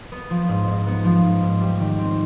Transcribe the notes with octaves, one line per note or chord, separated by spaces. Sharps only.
B3
F3
G#2
G#2
B3
F3
G#2
G#2
G3
D#3
C4